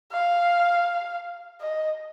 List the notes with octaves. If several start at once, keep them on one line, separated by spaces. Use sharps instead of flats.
F5
D#5